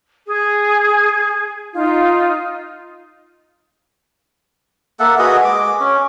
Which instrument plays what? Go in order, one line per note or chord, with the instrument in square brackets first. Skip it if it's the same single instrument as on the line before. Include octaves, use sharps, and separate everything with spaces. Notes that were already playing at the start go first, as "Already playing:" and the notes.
[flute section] G#4
D#4 F4
[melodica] A#3 A4 E5 F#5
F#4 G#4 B4 D#5
G#3 D6
C#4